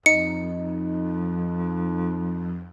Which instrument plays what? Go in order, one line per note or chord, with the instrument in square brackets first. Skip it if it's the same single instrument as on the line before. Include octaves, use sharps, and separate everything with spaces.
[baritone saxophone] F2 [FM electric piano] D#4 [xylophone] C#7